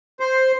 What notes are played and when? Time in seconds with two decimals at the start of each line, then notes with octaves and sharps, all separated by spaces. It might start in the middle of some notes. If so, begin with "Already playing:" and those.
0.20 C5